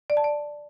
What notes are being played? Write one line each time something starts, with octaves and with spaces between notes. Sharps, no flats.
D5
A5
D5